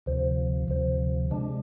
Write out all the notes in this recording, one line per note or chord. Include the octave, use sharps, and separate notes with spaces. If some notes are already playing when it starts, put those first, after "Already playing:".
D2 C3 F3
D2 C3 F3
C3 G#3 D4